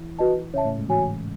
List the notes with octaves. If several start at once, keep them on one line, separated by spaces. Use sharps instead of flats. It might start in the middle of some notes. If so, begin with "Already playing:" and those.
Already playing: E3 E4
F#4 B4 D#5 A5
C#3 C#4 C#5 E5 A5
A2 A3
G#2 G#3
E3 F#4 C#5 G#5